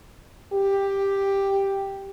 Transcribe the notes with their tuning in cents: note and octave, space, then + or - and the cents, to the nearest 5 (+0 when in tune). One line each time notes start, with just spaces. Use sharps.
G4 +5